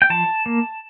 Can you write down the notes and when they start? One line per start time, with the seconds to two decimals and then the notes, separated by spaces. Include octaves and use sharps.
0.02 G5
0.10 F3 A5
0.46 A#3